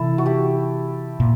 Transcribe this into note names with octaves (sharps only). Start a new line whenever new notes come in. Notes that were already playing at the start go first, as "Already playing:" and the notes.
Already playing: C3 E3 E4 A4
F#4
G4
A#2